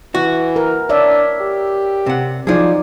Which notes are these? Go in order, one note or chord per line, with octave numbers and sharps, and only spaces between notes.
E3 F#4
A#4
D4 C#5 D5 E5
G4
C3 F#5
F3 F#3 D#4 G#4 D5